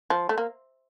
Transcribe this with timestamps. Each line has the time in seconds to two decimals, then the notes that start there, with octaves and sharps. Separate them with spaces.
0.10 F3
0.29 A3
0.38 A#3